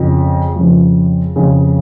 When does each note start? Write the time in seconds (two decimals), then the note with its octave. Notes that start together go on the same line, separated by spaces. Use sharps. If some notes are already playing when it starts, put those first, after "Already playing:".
Already playing: F2 C#3 F3
0.56 F2 C#3 F3
1.36 F2 C#3 F3